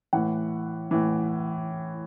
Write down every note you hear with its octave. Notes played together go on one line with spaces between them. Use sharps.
A2 E3 F#5
A2 E3